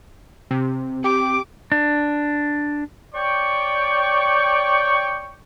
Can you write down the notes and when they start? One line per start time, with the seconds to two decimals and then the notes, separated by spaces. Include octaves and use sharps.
0.51 C3 C4
1.04 G4 D6
1.72 D4
3.14 C#5 D5 G5 C#6